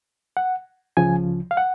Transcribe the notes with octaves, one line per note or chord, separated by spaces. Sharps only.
F#5
C#2 C#3 F3 G#5
F5
F#5